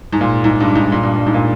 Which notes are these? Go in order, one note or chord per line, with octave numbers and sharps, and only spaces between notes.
G#2
A#2
G#2
G2
G#2
A#2
G2
G2
G#2
A#2